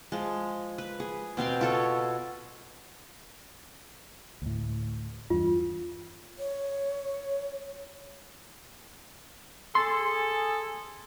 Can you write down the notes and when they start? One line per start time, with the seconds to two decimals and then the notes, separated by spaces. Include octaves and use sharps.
0.12 F3 G#3
0.78 B4
1.00 G#4
1.37 B2 C4 F5 C6
1.61 F4 A4 C#5
4.42 D2 A2
5.30 E2 G2 F4
6.39 C#5
9.75 G#4 A4 C6